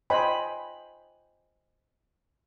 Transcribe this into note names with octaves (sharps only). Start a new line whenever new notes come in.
C5 D#5 G5 G#5 B5